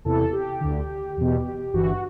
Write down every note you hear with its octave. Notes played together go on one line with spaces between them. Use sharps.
E2 C3 E3 A4
G4
D2 D3
E2 B2
G1 G2 E3 F#4